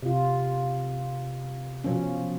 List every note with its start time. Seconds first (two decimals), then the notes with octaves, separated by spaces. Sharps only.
0.02 C3 F4
1.84 B2 F3 C#4